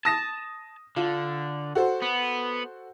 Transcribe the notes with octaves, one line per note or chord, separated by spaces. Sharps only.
A5 D#6 A#6 E7
D3 F4
F#4 A4 C5
B3